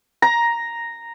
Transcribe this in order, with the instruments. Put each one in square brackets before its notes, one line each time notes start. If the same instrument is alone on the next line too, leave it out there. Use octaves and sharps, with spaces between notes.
[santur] A#5